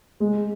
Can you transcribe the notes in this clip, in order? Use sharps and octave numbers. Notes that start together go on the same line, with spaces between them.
G#3